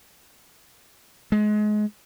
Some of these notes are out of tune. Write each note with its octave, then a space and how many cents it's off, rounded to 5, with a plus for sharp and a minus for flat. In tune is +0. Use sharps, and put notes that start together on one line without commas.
G#3 +25